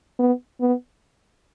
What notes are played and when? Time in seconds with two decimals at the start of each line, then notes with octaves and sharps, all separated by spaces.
0.19 B3
0.61 B3